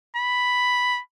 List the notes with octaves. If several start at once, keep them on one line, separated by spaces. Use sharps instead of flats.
B5